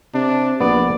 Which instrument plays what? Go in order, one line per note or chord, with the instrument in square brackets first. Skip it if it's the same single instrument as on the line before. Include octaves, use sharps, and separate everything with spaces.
[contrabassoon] C3 [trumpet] D4
[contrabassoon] A#1 [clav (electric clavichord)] B3 [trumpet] D5